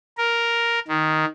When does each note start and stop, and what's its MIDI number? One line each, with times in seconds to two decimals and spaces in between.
0.18 0.80 70
0.88 1.25 51